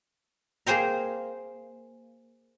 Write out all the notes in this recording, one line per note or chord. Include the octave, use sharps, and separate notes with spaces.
A#3 G#4 C5 G5 A#5